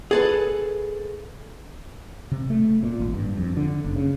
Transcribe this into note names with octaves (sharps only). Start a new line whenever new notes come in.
G#4 A4 B4
C3
A3
A#2
G#1
G2
F2
D3
F#1
C#3